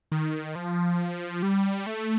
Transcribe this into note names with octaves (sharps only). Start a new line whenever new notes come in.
D#3
F3
G3
A3